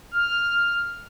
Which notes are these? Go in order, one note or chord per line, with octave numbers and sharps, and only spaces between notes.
F6